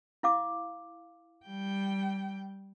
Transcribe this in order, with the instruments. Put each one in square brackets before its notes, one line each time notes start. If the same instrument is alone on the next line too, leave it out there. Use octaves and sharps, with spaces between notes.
[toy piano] E4 F5 D6
[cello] G3 G5